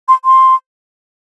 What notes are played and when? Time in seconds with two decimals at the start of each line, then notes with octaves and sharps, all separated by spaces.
0.08 C6
0.25 C6